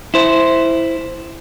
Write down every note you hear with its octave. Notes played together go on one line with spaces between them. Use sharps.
E4 C5